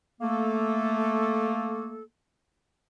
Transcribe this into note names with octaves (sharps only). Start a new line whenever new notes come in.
A3 A#3 A4